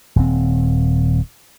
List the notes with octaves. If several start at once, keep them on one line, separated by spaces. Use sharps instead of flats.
D#1 C4